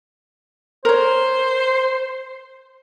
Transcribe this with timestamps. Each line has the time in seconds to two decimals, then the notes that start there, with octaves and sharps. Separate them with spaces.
0.85 A#4 C5 C#5